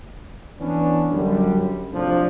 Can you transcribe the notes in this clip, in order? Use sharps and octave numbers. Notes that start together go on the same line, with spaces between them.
E3 B3 C#4 D4
F#2 D3 G3
A2 C3 F3 D4